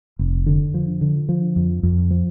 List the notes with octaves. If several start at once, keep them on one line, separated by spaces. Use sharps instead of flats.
F1
D3
F3
D3
F3
F2
F2
F3